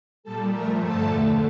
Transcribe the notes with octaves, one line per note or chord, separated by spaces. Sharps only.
A#2 G3 A4 A5
A#2 F3 A3 A#4 A#5
G2 D3 F3 A3 A4 A5
E2 D3 A3